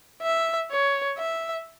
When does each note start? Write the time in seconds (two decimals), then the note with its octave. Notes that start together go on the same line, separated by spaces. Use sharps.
0.22 E5
0.71 C#5
1.18 E5